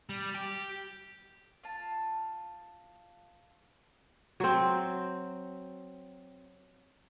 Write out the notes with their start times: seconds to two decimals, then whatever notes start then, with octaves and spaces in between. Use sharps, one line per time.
0.09 G3
0.35 G4
1.64 F4 A5
4.40 F#3 C4